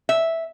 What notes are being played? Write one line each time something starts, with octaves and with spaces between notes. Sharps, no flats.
E5